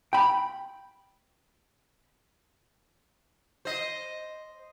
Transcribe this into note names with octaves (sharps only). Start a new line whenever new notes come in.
G5 B5
C5 D#5